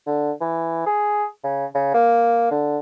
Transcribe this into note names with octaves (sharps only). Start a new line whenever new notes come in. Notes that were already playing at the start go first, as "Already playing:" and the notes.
D3
E3
G#4
C#3
C#3
A#3
D3